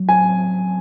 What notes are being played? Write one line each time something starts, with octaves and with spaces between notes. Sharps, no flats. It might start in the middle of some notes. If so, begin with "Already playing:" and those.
Already playing: F#3
G#5